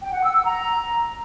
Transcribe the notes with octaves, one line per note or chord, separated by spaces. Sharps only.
G5
F#5
E6
E6
A#5